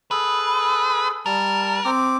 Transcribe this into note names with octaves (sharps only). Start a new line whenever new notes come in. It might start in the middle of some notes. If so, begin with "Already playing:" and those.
G#4 A4 B4
G3 A#4 A5
C4 D6